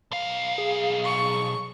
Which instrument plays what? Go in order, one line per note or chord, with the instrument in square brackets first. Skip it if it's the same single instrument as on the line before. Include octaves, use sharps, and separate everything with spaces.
[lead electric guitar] B1 F5
[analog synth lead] G#4
[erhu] C#6